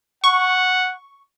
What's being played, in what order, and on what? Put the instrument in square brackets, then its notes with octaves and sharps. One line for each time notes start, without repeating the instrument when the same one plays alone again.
[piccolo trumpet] F#5 [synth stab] C#6